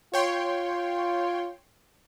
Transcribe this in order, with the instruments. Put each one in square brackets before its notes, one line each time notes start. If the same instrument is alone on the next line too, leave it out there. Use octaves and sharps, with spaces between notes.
[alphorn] F4 [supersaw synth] C#5 G5 C6